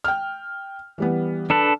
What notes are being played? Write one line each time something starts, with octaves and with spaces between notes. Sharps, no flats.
G5 F6
E3 G3 B3
D4 A4 B4 A5